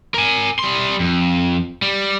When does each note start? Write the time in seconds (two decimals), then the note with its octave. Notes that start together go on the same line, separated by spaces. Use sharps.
0.14 A#4 G#5
0.59 G3 C6
1.00 F2
1.82 G3